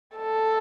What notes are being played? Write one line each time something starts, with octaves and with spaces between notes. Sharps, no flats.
A4